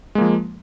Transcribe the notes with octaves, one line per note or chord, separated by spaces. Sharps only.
F3 G#3 A#3